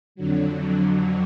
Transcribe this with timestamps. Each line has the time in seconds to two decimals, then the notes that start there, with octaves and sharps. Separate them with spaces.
0.15 F2 D3 F#3